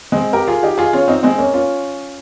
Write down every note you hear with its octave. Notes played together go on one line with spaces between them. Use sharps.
G#3 C4
G4 A#4
F4 G#4
D#4 G4
F4 G#4
C#4 F4
C4 D#4
G#3 C4
A#3 C#4
C#4 F4